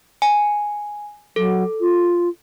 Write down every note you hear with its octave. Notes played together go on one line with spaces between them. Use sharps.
G#5
F#3 A4
F4